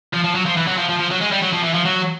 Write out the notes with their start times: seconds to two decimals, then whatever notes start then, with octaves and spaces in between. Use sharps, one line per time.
0.14 F3
0.24 F3
0.35 F#3
0.46 F3
0.57 E3
0.67 F#3
0.78 F3
0.89 F3
0.99 F3
1.10 F#3
1.21 G#3
1.31 G3
1.42 F#3
1.53 F3
1.63 E3
1.74 F3
1.85 F#3